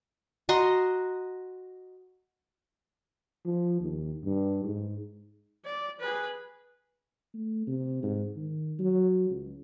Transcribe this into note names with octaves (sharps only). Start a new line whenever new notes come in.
F#4 D#5 A#5 C6
F3
D#2
G2
G#2
D5
G#4 B4
A3
C3
G#2
D#3
F#3
C#2